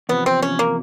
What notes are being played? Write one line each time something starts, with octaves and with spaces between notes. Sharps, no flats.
E2 C3 F3 B3
C4
C#4
A#3